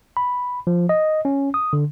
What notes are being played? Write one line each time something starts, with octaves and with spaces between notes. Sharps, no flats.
B5
F3
D#5
C#4
D#6
D3